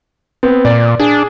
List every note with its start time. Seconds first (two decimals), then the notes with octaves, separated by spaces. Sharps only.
0.43 B3 C4
0.65 A#2 D5
1.00 D4 G#4